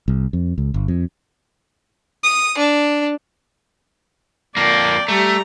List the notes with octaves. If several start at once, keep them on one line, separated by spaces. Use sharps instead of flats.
C2
F2
C#2
G1
F2
D#6
D4
F2 A#3 D5 G5
G3 A3 A#5